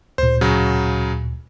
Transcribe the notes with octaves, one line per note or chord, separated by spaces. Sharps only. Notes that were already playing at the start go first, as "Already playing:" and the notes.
D2 A#2 C5
C#3 F#3